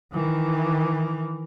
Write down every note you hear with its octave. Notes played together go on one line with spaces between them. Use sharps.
D#3 E3